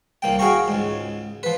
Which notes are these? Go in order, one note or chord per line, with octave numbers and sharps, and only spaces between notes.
C2 A#3 G5
F#4 G#4 F5 G5 A#5 C#6
C#2 G#2
F3 B4